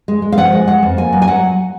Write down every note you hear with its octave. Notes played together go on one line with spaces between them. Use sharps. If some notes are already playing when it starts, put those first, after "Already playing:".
G#3
G#3
F5
F3 F#5
G#3
G#3 F#5
F2
A#3 G#5
F#3
G#5
F#3 F#5